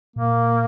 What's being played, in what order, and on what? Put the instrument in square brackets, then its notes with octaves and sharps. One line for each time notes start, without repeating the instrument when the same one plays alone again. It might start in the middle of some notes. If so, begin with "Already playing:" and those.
[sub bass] A#2 [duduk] A#3